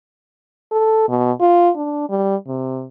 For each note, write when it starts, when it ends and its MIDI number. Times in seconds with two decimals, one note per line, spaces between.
0.72 1.07 69
1.08 1.32 47
1.41 1.70 65
1.76 2.07 62
2.09 2.35 55
2.47 2.86 48